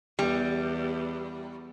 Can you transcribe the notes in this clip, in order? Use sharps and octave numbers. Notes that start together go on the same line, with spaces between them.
E2 G3